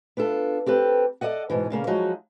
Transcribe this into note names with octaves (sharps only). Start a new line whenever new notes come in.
B3 D4 F4 A4
C4 G4 A4 B4
A4 B4 D5 D#5 F#5
G#2 B2 E3
A#2 C#3 A#3 C#4
F3 F#3 G#3 D#4 F#4